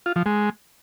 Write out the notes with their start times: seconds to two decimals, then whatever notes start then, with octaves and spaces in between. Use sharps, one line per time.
0.06 F4
0.16 F3
0.26 G#3